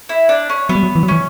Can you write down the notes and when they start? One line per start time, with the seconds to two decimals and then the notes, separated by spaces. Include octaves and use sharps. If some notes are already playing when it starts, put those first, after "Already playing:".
0.09 E4
0.29 D4
0.50 C#4
0.69 F#3 B3
0.75 G3
0.83 F#3
0.96 E3
1.03 F#3
1.08 E3 C#4